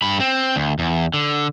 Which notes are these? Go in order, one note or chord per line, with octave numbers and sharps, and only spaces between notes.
G2 B5
C4
D2
E2
D3